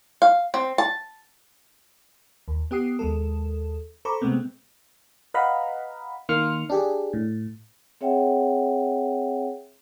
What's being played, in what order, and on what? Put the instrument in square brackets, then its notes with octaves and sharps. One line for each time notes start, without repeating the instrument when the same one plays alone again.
[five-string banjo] F5
C4
A5
[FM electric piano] D#2
B3 G4 D#6 C7
D#2 G#3 A4
A4 C5 A#5 B5 C#6 D6
C3 G#3 A3 B3 C4
B4 D#5 F5 F#5 A#5 B5
D#3 A#3 C6 F6 C#7
D4 G4 G#4
A2
[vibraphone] C4 G#4 C#5 E5 F#5 G5